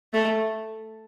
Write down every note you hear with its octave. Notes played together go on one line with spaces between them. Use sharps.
A3